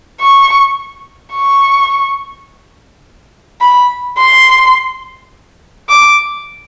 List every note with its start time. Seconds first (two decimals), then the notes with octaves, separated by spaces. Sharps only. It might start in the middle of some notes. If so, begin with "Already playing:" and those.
0.20 C#6
1.34 C#6
3.61 B5
4.18 C6
5.89 D6